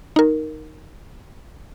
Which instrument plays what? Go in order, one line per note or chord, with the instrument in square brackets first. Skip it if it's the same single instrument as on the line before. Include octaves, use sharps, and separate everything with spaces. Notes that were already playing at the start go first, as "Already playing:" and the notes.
[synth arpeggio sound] D#4 A#4